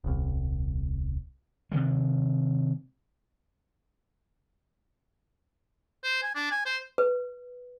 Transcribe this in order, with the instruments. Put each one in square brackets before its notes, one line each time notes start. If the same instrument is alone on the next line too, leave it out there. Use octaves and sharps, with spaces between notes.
[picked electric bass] D#1 C2
[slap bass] C3 D#3 G#3
[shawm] C5
G#5
D4
G#5
C5
[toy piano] B4